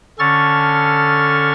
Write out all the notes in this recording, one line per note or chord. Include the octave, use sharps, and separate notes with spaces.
D3 C#4 A4 C#6 F6 A6